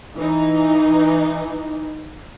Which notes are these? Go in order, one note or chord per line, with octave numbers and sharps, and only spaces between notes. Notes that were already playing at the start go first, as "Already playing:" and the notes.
E3 D#4